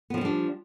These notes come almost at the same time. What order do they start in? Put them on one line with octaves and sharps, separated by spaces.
B3 F3 C4 G3 D4